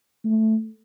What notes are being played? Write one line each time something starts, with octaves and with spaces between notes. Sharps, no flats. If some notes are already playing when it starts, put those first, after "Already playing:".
A3